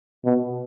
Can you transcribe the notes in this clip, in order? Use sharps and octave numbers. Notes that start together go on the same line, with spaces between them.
B2